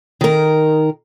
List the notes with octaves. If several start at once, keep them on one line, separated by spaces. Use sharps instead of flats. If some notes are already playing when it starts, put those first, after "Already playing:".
D#3 A#4